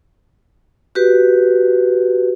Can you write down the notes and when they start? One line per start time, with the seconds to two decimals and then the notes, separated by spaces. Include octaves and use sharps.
0.95 F#4 G4 B4